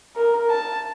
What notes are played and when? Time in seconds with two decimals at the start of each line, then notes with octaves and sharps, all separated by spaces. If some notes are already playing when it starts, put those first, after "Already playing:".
0.16 A#4
0.50 A5